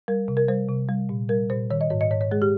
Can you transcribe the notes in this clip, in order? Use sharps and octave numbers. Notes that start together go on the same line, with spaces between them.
G3 A#4
C3
A#4
G3 C5
C3
G3
A#2
G3 A#4
A#2 C5
D#3 C#5
D#5
G#2 C#5
D#5
G#2 C#5
C#5
G#3 G#4
G4